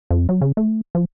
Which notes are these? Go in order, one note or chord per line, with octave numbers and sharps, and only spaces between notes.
F2
F#3
C#3
A3
F3